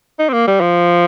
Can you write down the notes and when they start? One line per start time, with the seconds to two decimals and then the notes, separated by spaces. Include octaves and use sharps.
0.19 D#4
0.29 C4
0.33 A#3
0.47 G3
0.61 F3